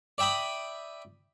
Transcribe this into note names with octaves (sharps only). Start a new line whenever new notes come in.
D5 E5 G5 B5 D#6